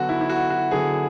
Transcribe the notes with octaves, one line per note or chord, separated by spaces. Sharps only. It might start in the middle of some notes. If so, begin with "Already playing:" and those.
Already playing: D3 F#3 B3 F#4
E4
E4
F#4
F#4
D3 F#3 B3 G#4